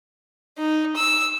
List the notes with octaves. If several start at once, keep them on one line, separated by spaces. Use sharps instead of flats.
D#4
E6